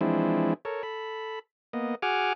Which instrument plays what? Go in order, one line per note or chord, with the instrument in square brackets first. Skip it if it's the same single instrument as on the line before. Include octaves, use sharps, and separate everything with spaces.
[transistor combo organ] E3 F3 G#3 C4 D4 E4
A4 A#4 C#5
A4 B5
A#3 B3 D#5
F#4 G#4 F#5 G#5 D6 F6